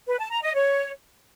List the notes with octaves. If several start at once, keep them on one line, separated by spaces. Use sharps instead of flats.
B4
A5
A#5
D#5
C#5